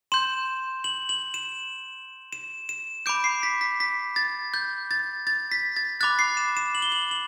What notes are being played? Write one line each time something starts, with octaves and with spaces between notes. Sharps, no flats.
C6 G6 E7
F#7
F#7
E7
E7
E7
B5 D6 G6 D7
C7
B6
B6
B6
A6
G6
A6
A6
B6
A6
B5 D6 F#6 A6
C7
E7
E7
F#7
G7
F#7
F#7